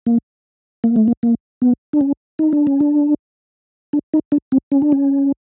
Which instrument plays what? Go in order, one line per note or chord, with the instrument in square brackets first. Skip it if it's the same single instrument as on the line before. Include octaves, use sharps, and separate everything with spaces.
[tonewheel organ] A#3
A#3
A3
A#3
A#3
B3
D4
C#4
D#4
D4
C#4
D4
D4
D#4
D4
C4
C#4
D4
C#4